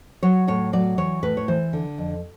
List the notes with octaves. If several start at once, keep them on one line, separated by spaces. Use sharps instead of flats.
F#3 C#5
A2 C#5
F#3 D5
E3 C#5
A2 B4
C#5
E3 C5
D3
F2